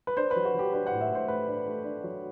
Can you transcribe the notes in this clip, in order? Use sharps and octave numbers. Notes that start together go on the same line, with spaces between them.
B4
D4 C5
B4
F#3
F#4
F#3 G4
D4 B4
A2 F#5
E5
A2 C5
A3 B4
D4
A3
D4
F#3